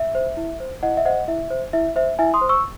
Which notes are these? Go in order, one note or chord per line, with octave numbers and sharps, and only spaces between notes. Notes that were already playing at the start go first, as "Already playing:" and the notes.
Already playing: E5
C5
E4
C5
E4 D#5 F#5
E5
C5 D#5 F#5
E4 E5
C5
E4 E5
C5 E5
E4 E5 G#5
C6 D#6
C5
C#6 E6